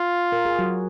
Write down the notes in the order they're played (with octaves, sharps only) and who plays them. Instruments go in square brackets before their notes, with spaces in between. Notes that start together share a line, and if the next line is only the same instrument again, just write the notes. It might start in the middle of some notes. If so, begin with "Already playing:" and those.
Already playing: [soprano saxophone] F4
[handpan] A#4
G#4
F#3 F#4